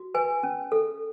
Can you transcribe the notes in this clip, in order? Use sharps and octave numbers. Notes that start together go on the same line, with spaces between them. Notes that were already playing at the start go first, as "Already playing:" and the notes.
Already playing: F#4
B4 G#5
C#4
A4